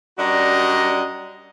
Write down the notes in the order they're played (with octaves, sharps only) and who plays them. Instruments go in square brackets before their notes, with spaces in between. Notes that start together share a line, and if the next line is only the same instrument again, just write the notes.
[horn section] F#2 G3 D4 F#4 D#5 A#5